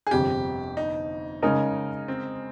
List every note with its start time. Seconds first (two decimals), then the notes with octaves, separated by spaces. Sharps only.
0.07 G#4
0.11 G1 F2 C3 G4
0.77 D#4
1.42 C#3 G#3 C#4 D#4 A#4 D#5
2.08 C4